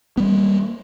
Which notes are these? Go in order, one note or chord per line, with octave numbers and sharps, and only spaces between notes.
G3 A#3 B3